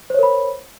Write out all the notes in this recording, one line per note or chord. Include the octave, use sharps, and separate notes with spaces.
A#4 C5 C#5 B5